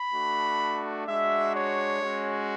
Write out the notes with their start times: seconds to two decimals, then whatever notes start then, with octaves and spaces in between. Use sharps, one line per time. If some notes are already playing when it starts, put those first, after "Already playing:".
Already playing: B5
0.13 A3 D4 F#4
1.07 G#3 D4 F#4 E5
1.55 C#5
2.02 G#3 C#4 F#4